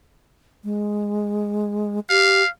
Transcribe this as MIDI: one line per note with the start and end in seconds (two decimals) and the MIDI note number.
0.64 2.00 56
2.10 2.42 67
2.10 2.48 77